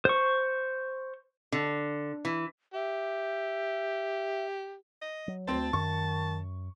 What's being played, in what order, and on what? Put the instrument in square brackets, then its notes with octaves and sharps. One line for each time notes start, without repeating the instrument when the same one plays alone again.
[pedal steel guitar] C5 C#6
[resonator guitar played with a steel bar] D3
E3
[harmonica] G4 [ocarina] E5
[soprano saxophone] D#5
[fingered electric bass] F#3
[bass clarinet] D2 [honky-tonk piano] C4 C5 [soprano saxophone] A5
[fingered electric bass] F#2 [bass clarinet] D#3 [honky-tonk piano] C#6